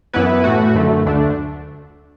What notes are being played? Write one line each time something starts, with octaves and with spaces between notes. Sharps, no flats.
F#2 E3 B3 E4 B4
A2 E3 A3 F#4
F#2 D3 A3
D2 D3 A3 D4